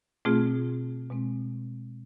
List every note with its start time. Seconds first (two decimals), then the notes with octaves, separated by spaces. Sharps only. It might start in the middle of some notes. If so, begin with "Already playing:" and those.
0.25 B2 A3 C4 F4 G#4
1.10 B2 G#3 C4